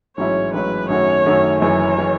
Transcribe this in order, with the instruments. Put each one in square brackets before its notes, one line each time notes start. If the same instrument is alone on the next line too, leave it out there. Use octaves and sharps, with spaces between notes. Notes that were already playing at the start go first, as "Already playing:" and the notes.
[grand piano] A1 G#2 F#3 C#4 E4 [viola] C#5
[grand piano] A1 G#2 F#3 C#4 E4 [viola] B4
[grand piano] F#2 D#3 A3 C#4 F#4 [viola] C#5
[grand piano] F#2 D#3 A3 C#4 F#4
[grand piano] F#1 F#2 E3 [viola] C#5
[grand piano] E3